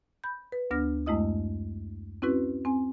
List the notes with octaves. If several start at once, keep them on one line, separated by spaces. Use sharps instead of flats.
B5 G6
B4
D2 B3 D4 F6 A#6
F#2 G#3 A3 E4 D#5 D#6
C4 C#4 E4 F#4 B4
C4 G#5